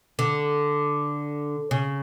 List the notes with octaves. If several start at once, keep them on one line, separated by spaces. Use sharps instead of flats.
D3
C#3